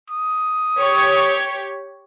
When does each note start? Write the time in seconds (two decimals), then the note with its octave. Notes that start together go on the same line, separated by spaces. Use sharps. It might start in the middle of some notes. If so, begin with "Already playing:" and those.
0.10 D#6
0.79 G4 C#5